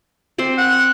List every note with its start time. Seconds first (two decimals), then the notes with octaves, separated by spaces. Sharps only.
0.38 C4 C5 D5
0.58 F#5